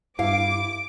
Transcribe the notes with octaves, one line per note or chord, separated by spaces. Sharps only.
G2 E4 F5 D6